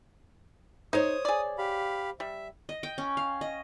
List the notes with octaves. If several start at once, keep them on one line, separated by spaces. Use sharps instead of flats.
D#4 C5 C#5 D#6
G#4 D5
G4 F5 B5
G3 E5
D#5
G5
C#4
F5
D#5